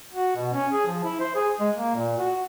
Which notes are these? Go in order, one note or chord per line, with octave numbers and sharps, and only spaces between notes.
F#4
B2
C#4
G#4
F3
E4
C5
G#4
G#3
A#3
A#2
F#4